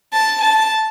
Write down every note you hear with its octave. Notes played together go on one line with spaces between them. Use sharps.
A5
A5